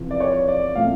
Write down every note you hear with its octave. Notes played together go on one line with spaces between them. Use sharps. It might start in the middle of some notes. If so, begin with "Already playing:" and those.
Already playing: E2 C3 F3
D5
C#5
D5
A#2 F3 A3 C4 F5